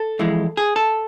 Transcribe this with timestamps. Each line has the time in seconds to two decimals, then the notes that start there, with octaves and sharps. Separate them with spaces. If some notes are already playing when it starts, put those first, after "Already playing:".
Already playing: A4
0.19 F2 E3 G#3
0.57 G#4
0.76 A4